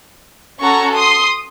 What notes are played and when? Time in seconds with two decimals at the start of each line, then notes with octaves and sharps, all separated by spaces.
0.61 C#4 F#4 A4 A#5 C#6
0.96 C6 D#6